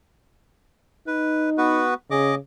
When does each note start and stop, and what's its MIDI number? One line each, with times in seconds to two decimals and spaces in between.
1.07 1.88 63
1.07 1.50 71
1.58 1.94 59
1.58 1.94 66
1.58 1.94 71
2.11 2.36 49
2.11 2.35 68
2.11 2.35 75
2.11 2.35 86